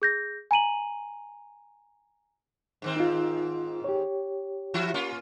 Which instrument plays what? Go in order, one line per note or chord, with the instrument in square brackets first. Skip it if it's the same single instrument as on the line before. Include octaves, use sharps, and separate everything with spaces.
[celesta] G#4 G6 A#6
G#5 A#5 D#7 F#7
[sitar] G#2 D#3 C4
[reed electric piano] D#4 F4
G4 C#5
[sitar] E3 E4 F#4
A#3 C#4 F4